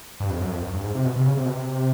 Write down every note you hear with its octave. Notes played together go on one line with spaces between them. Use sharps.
G2
F2
F#2
F2
F#2
G2
G#2
C3
B2
C3
C#3
C3
B2
C3